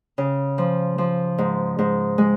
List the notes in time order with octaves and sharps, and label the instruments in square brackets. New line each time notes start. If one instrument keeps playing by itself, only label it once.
[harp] C#3
F3
F3
G#2
G#2
G#3